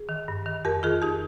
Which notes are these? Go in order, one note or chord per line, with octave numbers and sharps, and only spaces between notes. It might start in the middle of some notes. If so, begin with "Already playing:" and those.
Already playing: G#4
D#3
G2
D#3
F2 G4 A#4
D#3 F4 G#4
F2 D#4 G4